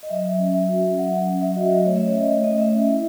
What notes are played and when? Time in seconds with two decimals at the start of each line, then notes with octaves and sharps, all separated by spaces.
0.03 D#5
0.10 F#3 E5
0.25 F#3
0.39 C#4
0.54 F#3 E5
0.69 F#4
0.83 C#4
0.97 F#3 F#5
1.12 F#3
1.26 C#4
1.41 F#3 E5
1.56 F#4 D#5
1.70 F#3 D#5
1.85 A3 C#5
1.96 C#4 E5
2.08 C#5
2.15 C#4 D#5
2.29 A3 C#5
2.44 A3 D#5
2.58 A3 E5
2.72 C#4
2.88 E4